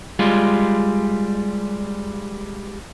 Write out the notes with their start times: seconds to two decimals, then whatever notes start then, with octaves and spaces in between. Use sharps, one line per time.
0.19 G3 G#3 F4